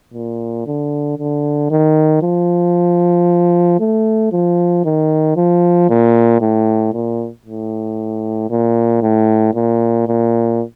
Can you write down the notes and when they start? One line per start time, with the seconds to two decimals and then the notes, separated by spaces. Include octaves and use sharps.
0.14 A#2
0.66 D3
1.19 D3
1.71 D#3
2.22 F3
3.80 A3
4.32 F3
4.85 D#3
5.36 F3
5.89 A#2
6.41 A2
6.93 A#2
7.46 A2
8.51 A#2
9.02 A2
9.54 A#2
10.08 A#2